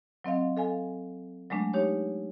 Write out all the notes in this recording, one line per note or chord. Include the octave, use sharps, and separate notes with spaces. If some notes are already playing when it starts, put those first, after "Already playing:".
F#3 C4 D#5 F5
A4 F5 G#5
F#3 G#3 A3 D4
D#4 G4 C#5